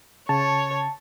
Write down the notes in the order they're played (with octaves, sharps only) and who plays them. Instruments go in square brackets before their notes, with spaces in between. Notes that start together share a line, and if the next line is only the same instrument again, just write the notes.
[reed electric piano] C#3 [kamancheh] C#5 [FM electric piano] A5